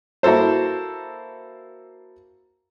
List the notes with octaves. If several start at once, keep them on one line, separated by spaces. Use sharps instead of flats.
A#3 E4 F#4 A4 C5